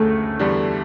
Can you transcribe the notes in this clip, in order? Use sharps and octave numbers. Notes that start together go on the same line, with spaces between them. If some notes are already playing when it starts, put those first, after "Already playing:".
Already playing: D2 C#3 A3
E2 D3 G3 D4